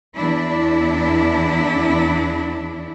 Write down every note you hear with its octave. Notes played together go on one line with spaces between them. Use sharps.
E2 D4 E4